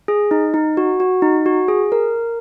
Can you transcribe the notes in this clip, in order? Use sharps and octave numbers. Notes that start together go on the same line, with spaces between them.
G#4
D#4
D#4
F#4
F#4
D#4
F#4
G#4
A#4